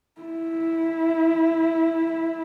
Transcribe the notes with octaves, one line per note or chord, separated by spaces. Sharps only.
E4